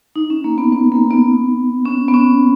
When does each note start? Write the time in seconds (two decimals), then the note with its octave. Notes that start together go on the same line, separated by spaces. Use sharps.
0.16 D#4
0.30 C#4
0.44 A#3
0.58 B3
0.72 B3
0.92 A#3
1.11 B3
1.85 C#4
2.08 B3
2.14 C#4